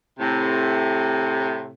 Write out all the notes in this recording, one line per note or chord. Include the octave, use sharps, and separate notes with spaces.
A2 C3